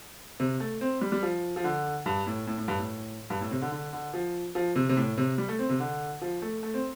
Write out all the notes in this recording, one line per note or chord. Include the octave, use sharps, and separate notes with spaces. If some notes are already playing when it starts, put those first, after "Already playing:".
C3
A3
C4
G3
G3
F3
F3
D3
G2
A2
A2
A2
G2
A2
G2
A2
C3
D3
D3
D3
F3
F3
C3
C3
A2
C3
G3
A3
C4
C3
D3
F3
A3
A3
C4